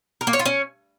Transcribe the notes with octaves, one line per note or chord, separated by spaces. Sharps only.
A#4
A#3
C#5
F4
C#4